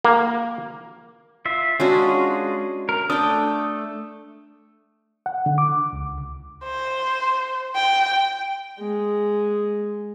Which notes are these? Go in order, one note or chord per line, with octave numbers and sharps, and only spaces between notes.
A#3
F4 E5
G#3 C#4 D4 F4 F#4 G#4
A#4
A3 D4 D5 G5 D#6
F#5
D3
D6
C#2
C5
G5
G#3